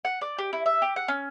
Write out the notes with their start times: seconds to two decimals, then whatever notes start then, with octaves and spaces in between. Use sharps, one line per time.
0.05 F#5
0.21 D5
0.38 G4
0.53 E4
0.66 E5
0.82 G4
0.96 F#5
1.08 C#4